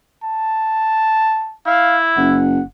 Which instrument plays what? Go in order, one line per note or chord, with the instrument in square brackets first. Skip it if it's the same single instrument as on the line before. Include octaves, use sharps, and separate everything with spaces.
[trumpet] A5
[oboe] E4 [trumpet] F5
[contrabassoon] F#1 [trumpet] F#5